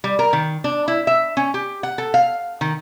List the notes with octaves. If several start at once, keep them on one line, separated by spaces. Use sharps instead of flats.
G3
A#4
D#3
D4
E4
E5
C#4
G4
F#5
A4
F5
D#3